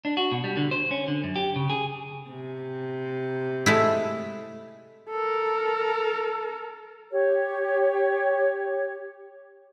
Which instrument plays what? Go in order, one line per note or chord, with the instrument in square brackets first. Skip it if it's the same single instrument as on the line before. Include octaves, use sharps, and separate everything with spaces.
[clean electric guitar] D4
F#4
B2
G3
D3
C5
C#4
D3
F#2
G4
C#3
G#4
[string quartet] C3
[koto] G#3 A3 E4
[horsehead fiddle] A4 A#4
[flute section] G4 C#5